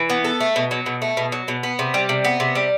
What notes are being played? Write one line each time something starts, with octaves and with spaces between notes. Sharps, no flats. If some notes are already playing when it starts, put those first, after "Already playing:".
Already playing: E3
B3
A4
A3
B2
F#3
B2
A3
B2
F#3
B2
B3
C3
G3
C3
B3
C3
G3